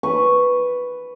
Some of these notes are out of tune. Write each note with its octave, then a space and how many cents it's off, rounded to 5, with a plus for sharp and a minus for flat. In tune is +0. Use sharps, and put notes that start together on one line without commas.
B4 +0 C#6 +0